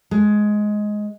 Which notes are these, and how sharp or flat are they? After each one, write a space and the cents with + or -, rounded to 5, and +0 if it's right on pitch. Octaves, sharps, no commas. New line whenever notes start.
G#3 +10